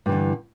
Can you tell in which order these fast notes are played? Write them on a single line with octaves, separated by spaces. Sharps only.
G2 E3 D3